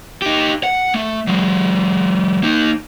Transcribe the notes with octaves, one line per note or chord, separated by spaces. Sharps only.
D#4 G4
F#5
A3
F#3 G#3
A#3 D#4